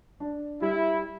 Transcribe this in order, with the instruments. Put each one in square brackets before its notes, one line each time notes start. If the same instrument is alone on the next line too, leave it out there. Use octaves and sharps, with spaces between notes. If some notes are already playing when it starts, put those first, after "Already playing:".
[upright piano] D4
[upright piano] G3 [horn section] E4